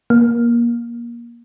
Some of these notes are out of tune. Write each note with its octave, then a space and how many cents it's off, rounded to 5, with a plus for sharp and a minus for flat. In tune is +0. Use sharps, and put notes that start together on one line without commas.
A#3 +20